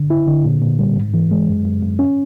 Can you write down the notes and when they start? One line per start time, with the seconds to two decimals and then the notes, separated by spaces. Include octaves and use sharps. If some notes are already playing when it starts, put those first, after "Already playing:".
Already playing: D3
0.10 E4
0.27 D3
0.44 A#2
0.62 A#2
0.79 G3
0.96 G#2
1.14 E3
1.31 G#3
1.48 F#2
1.65 F#2
1.82 F#2
1.99 C#4